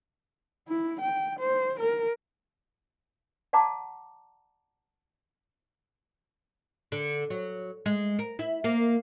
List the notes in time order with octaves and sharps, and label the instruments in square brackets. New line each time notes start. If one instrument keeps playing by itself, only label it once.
[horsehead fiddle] E4
G5
C5
A#4
[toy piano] D5 F#5 A5 A#5 C6 D6
[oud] D3
F#3
G#3
A#4
E4
A#3